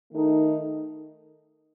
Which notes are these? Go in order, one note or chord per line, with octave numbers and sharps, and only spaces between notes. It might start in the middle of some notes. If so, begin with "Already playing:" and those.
D#3 A3 D#4 A#4